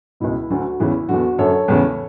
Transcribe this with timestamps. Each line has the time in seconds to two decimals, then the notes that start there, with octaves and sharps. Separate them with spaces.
0.20 C#2 B2 E4
0.50 D2 D3 F#4
0.80 E2 C#3 E3 E4
1.09 E2 D3 F#4
1.38 F#2 D3 A4 C#5
1.68 E2 C#3 E3